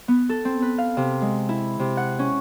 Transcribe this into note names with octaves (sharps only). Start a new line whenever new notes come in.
B3
A4
C4
B4
F5
C3
G#3
E4
C3
F#5
C#4